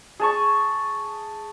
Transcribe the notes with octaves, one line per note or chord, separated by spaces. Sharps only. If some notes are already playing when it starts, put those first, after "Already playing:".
G#4 A5 C#6